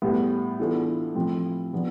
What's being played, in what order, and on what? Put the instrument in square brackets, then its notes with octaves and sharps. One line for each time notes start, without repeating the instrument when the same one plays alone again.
[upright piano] A2 G3 B3
E3 B3 D4 F4 A4
A2 F3 C4 F4
F3 B3 D4